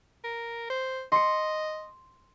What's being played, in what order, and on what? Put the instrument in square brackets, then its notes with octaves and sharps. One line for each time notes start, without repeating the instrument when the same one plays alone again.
[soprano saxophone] A#4
C5
[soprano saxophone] D#5 [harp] C6 C#7